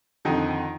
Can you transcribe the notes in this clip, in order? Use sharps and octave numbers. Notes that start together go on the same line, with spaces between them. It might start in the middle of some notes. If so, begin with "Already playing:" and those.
F2 D3 D#3 F3 D#4